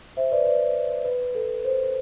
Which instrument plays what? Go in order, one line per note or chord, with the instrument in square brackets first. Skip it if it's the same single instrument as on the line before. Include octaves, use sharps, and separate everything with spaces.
[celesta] C5 E5
B4 D5
B4 D5
B4
A4
C5